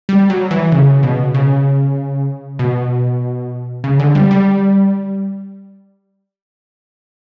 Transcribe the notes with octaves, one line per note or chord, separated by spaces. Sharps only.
G3
F#3
E3
C#3
B2
C#3
B2
C#3
D3
G3
G3